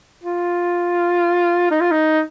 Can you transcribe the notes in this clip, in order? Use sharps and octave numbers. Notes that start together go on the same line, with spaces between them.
F4
D#4
F4
D#4